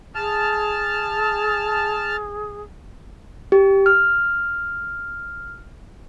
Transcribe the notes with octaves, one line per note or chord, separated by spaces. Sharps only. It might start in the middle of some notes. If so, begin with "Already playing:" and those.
G#4 A5 F6
G4
F6